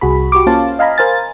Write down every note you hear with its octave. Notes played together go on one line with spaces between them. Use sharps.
C2 F#4 G#4 B5
F#4 G4 C#6 D6
A#3 C#4 F4 C5 F5 A5
D#5 F5 G#5 A#5 B5
A#4 C5 F5 G#5 A6